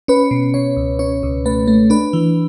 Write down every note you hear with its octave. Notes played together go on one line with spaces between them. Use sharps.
C#4 B4
B2
B2 C#5
C#2
C#4 C#5
C#2
A3 B4
A3
D4 B4
E3